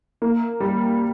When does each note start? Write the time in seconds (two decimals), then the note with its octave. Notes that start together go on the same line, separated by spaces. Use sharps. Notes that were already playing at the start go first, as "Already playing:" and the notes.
0.22 A#3
0.60 G3